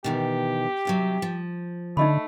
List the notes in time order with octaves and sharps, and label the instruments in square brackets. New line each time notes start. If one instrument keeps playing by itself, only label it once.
[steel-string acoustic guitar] B2 D#3 E3 [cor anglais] G4
[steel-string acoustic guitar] D#2 C3 F#3
F3
[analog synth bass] D3 [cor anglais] A3 [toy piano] D#4 D#5 B5